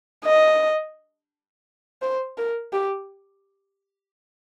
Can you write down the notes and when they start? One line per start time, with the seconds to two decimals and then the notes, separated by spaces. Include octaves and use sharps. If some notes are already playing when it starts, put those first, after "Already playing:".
0.25 D#5
2.02 C5
2.38 A#4
2.73 G4